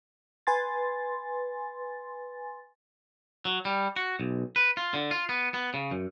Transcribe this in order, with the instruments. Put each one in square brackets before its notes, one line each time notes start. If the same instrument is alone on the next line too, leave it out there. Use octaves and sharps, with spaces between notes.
[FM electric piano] B4 G#5 C6 A6
[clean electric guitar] F#3
G3
F#4
B1
B4
F4
D3
F4
B3
B3
C#3
F#2